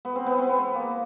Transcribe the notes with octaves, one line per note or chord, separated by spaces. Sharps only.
B3
C4
B3
C4
B3
A#3